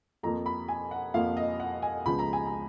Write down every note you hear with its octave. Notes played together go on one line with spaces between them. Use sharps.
F2 F3 A#3 A#5
B5
G#5
F#5
F2 F3 A#3 F5
D#5
F#5
G#5
C#2 C#3 F3 B3 B5
A#5
G#5
A#5